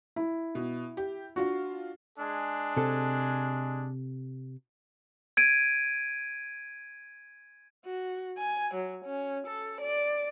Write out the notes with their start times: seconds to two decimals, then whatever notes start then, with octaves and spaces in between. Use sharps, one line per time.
0.16 E4
0.55 B2
0.97 G4
1.36 D4 F4 F#4
2.19 G#3 D4 G#4
2.77 C3 A4
5.37 G#6 D7 D#7
7.85 F#4
8.38 G#5
8.75 F#3
9.06 C#4
9.47 A4
9.81 D5